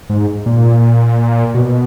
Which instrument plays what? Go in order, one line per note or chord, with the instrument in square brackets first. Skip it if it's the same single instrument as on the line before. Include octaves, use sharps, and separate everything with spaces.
[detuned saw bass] G#2
A#2
B2